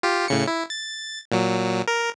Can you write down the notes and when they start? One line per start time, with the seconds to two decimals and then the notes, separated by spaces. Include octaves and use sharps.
0.03 F4 G4
0.28 A2 C#3 C#7
0.47 E4
0.70 A6
1.32 A#2 F#3
1.88 A#4